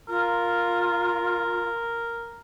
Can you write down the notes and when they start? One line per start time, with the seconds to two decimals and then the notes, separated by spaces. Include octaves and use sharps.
0.09 F4 A#4